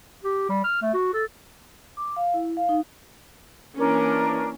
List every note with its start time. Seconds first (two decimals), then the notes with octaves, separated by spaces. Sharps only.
0.24 G4
0.49 G3
0.64 F6
0.82 A3
0.94 F#4
1.14 A4
1.97 D6
2.16 F5
2.34 E4
2.57 F5
2.69 D#4
3.78 E3 A#3 C#4 D4 A#4